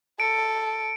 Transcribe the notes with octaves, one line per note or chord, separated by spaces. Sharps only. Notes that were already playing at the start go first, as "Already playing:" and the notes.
A4 C#7 D7